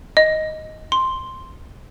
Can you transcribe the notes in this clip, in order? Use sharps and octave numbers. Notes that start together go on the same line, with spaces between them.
D#5
C6